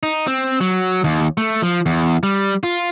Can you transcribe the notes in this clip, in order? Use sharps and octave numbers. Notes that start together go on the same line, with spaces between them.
D#4
C4
F#3
D#2
A3
F3
E2
G3
F4